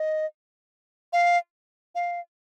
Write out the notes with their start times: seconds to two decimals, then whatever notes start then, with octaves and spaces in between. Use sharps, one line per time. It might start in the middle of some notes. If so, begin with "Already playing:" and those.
Already playing: D#5
1.13 F5
1.95 F5